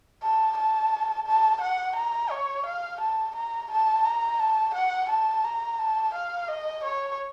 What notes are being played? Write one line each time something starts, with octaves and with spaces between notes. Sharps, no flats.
A5
A5
A5
F#5
A#5
C#5
F5
A5
A#5
A5
A#5
A5
F#5
A5
A#5
A5
F5
D#5
C#5